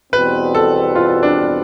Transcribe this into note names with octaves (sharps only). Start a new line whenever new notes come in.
E2 B2 G3 C4 B4
A4
F4
D4